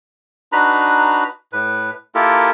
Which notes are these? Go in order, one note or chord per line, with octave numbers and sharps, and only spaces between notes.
D4 D#4 F#4 B4 A#5 B5
A2 B4
A#3 E4 F4 G4 A4 A#4